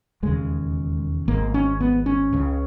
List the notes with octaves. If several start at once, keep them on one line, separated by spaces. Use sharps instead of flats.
E1 D#2 C#3 G#3
G#1 G#2 A#3
C#4
B3
C#4
C#2 C#3